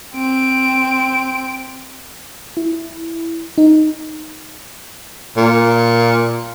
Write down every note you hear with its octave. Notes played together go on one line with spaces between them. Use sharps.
C4 D7
E4
D#4
A#2